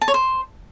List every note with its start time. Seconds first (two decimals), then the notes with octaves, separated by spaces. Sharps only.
0.02 A5
0.08 C#5
0.14 C5